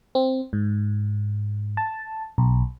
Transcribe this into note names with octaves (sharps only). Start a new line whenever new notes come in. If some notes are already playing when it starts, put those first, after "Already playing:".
C4
G#2
A5
B1